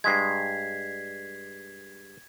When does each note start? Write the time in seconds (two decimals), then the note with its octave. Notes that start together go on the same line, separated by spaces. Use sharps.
0.04 G2 G#3 G#6 B6 C7